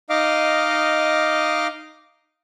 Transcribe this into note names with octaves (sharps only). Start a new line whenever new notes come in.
D#4 D#5 F5 D6